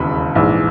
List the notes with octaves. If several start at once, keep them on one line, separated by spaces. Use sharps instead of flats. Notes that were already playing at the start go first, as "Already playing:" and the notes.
Already playing: E1 D#2 C#3 E3 B5
A#1 G#2 E3